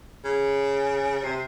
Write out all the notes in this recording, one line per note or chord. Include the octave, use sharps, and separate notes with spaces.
C#3
C3